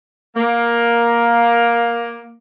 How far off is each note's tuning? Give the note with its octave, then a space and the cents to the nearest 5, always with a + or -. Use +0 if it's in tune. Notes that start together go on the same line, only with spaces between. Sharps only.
A#3 +10